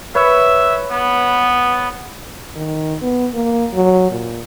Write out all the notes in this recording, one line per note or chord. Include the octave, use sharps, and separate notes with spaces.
B4 C#5 E5
B3
D#3
B3
A#3
F#3
A#2